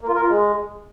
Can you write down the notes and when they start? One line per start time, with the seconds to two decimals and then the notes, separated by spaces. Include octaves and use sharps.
0.01 A#3
0.08 F4
0.15 A#4
0.22 F4
0.29 G#3